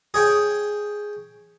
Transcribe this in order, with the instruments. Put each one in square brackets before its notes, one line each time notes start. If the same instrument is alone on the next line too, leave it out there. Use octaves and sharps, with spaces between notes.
[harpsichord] G#4 C#5 G5